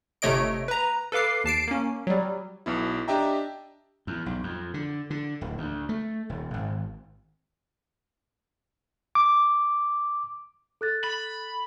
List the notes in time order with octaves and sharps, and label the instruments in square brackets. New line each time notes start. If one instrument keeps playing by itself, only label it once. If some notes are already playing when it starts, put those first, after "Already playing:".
[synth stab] G1 C3 A3 C#5 D#5 D7
B4 A#5
A4 B4 F5 D6 C7
D#2 A5 C7 D7
A#3 C#4
F#3 G3
[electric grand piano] B1 B2 E4
D4 G4 D#5 E5 G5 A#5
[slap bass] E2
B1
F2
D3
D3
D1
D2
A3
D#1
G#1
[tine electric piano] D6
[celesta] A4 F#6 A6
[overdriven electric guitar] B5